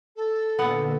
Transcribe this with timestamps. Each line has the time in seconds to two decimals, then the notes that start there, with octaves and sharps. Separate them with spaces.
0.16 A4
0.59 A#2 D3 B3 F#5